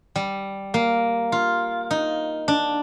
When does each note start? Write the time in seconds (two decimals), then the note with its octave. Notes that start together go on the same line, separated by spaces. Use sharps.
0.16 G3
0.74 A#3
1.32 F4
1.91 D#4
2.48 D4